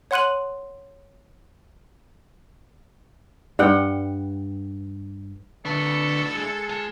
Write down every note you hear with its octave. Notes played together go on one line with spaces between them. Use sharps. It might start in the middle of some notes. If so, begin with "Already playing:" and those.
C#5 F#5 C6 F#6 D#7 F#7
G2 F#5 G5
D3 D4 E4 A4 B4 C#6
G#3
F4 A5